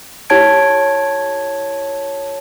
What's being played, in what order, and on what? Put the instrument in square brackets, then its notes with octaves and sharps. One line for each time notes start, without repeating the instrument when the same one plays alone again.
[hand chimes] E4 G4 C#5 A5 G#6 D7